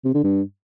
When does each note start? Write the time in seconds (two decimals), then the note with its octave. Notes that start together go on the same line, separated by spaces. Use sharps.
0.05 C3
0.14 D3
0.24 G2